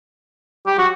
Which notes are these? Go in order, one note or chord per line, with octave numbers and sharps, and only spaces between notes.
G4
F#4